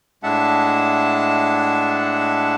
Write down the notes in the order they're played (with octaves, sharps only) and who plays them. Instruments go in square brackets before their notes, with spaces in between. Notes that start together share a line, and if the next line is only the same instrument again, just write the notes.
[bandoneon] A2 G#3 D4 E5 F#5 A5